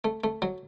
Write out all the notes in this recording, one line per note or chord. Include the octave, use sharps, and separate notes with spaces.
A3
A3
F#3